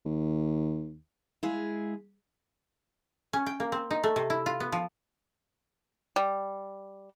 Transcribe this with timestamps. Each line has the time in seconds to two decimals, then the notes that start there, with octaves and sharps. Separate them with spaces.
0.06 D#2
1.43 G#3 E4 G#4 F5
3.33 C#4
3.46 G5
3.60 A#3
3.72 C4
3.91 D#4
4.04 A3
4.16 C3
4.30 E4
4.46 F4
4.60 B3
4.72 F3
6.16 G3